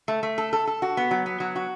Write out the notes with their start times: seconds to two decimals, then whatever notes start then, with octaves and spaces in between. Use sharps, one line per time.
0.08 A3
0.23 A3
0.38 A4
0.53 A4
0.67 A4
0.82 F#4
0.97 B3
1.11 F#3
1.26 B3
1.40 F#3
1.56 F#4